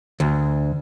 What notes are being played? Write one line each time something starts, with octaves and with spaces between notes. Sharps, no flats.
D2